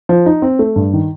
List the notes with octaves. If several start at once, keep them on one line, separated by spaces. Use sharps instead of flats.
F3
D#4
C4
A3
G2
D#3